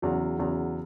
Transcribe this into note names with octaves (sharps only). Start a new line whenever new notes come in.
E2 C#3 F#3
E2 C#3 F#3